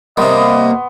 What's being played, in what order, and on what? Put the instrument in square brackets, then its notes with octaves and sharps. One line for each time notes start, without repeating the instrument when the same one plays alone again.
[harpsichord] C3 G3 [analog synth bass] A#3 [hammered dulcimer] B3 C6 D6 [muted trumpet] D#5